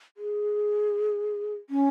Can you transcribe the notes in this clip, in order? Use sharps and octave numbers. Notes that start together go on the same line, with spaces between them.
G#4
C#4